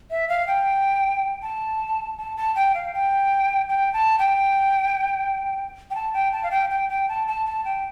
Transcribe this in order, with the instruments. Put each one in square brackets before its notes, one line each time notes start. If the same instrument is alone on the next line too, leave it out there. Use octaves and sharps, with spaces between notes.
[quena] E5
F5
G5
A5
A5
A5
G5
F5
G5
G5
A5
G5
G5
A5
G5
A5
F5
G5
G5
G5
A5
A5
A5
G5